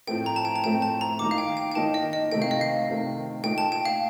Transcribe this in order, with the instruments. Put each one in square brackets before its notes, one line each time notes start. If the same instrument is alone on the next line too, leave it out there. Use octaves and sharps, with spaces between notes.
[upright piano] A2 F3 A3 C4 [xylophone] G5
[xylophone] A#5
A5
G5
A5
[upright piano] A2 F3 A3 C4 [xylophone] G5
[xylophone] A5
A#5
[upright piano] D#3 A#3 D#4 [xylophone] D6
[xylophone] F5
G5
G5
G5
[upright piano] D#3 A#3 D#4 [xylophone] A5
[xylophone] D#5
D#5
[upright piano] C3 D#3 A3 [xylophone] G5
[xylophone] F5
D#5
F5
[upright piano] C3 D#3 A3
[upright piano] A#2 A3 D#4 [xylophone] G5
[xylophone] A5
G5
F5